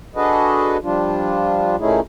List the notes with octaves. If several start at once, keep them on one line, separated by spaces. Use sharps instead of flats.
D4 F#4 G#4 A4 B4 D#5
F3 G3 D4 F4
A#2 A3 C#4 D#4 E4 G#4